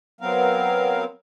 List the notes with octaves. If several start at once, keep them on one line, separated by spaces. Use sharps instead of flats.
F#3 B3 C4 A#4 F5